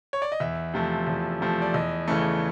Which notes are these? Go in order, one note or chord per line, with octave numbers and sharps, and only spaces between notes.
C#5
D5
D#5
E2 E5
C3 F3 A3
E2
C3 F3 A3
D5
E2 D#5
C#3 E3 A3